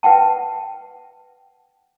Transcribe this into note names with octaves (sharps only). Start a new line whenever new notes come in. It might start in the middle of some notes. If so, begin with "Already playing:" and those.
B4 E5 F#5 G5 A5